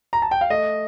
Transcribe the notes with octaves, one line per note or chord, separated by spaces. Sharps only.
A#5
A5
G5
F5
A3 D#5